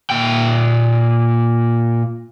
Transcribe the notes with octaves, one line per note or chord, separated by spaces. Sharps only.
A#2 G5